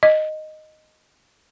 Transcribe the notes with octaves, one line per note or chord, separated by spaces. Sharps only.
D#5